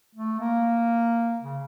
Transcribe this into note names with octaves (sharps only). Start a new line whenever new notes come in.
A3
A#3
C#3